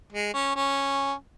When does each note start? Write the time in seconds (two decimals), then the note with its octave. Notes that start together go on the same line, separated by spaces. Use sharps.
0.13 G#3
0.34 C#4
0.55 C#4